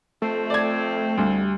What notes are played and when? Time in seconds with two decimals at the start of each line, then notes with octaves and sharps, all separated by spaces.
0.22 F2 A3 C4
0.50 D5 G#6
1.18 D2 G3